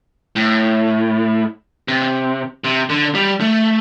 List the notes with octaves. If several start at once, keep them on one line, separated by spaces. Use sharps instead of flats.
A2
C3
C3
D3
G3
A3